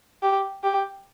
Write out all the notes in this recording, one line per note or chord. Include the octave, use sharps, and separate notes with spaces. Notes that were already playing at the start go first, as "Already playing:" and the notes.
G4
G4